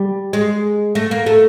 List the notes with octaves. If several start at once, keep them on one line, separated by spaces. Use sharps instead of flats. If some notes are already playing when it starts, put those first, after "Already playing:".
Already playing: G3
G#3
A3
A#3
A3